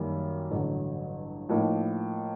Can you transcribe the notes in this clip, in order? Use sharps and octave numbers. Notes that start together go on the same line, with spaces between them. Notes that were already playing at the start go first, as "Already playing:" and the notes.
Already playing: F#2 D#3 G3 A#3
A1 G2 D3 F#3
A2 F3 A#3 D#4